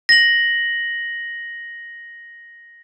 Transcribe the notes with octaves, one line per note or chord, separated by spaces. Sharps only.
A#6 F#7